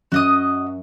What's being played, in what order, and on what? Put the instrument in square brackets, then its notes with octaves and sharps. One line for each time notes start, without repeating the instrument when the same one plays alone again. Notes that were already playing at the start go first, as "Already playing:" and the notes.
[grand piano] F#2 [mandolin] F#4 D#5 D#6